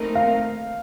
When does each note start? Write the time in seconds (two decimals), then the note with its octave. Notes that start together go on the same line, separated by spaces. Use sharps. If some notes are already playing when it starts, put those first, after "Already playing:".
Already playing: A3 C4 D#4 A#4
0.15 F5